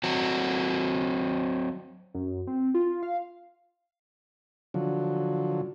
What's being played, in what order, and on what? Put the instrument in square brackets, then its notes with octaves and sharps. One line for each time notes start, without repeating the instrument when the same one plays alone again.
[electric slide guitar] F#3 C4 F#4
[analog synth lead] F#2
C4
F4
F5
[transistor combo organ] D3 F3 F#3